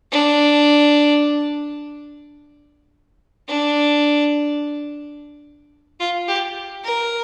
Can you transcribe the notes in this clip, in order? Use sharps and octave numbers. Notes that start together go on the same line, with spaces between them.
D4
D4
F4
G4
A#4